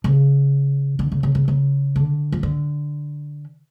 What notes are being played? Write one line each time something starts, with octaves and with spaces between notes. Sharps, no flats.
C#3
D3
C#3
C#3
C#3
C#3
D3
F3
D3